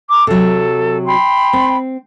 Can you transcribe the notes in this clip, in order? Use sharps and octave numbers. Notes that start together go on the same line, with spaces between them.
A#5 D6
C3 F#3 A4
G5 B5 C6
C4